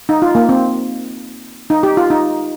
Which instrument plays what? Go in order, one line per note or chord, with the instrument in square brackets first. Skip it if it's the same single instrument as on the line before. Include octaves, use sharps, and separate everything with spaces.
[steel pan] D#4
F4
A#3
C4
D#4
G4
F4
D#4